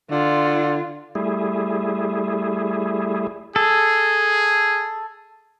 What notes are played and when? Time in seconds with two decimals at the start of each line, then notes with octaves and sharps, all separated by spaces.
0.11 D3 F4
1.15 G3 A3 E4 G#4
3.56 G#4 A4